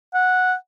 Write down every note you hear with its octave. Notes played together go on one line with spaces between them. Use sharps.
F#5